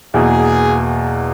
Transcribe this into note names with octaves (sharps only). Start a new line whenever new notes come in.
E2 B2 A#3 G#4